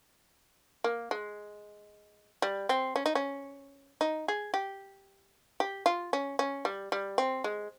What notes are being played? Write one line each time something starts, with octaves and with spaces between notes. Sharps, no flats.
A#3
G#3
G3
C4
C#4
D#4
C#4
D#4
G#4
G4
G4
F4
C#4
C#4
G3
G3
C4
G#3